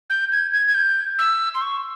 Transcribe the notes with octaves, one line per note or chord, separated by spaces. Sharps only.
G6
G#6
G#6
G#6
G6
E6
C6
C#6